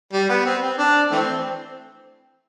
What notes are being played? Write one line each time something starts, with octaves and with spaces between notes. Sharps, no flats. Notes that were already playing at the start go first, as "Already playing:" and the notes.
G3
B3
C4
C4
D4
E3 A3 C4